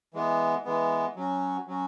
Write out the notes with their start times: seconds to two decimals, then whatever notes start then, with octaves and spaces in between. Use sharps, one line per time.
0.14 E3 G#3 B3
0.65 E3 G#3 B3
1.16 F#3 C#4 F#4
1.67 F#3 C#4 F#4